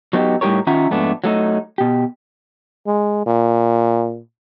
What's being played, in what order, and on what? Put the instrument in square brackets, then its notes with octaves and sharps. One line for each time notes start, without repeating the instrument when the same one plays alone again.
[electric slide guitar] F#3 B3 D#4 E4 G4
A2 G3 D#4 G4 A#4 C#5
D#3 C#4 F4 E5 F#5 A#5
F2 G#2 A3 B3 D4
F#3 A3 D#4
B2 G4
[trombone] G#3
A#2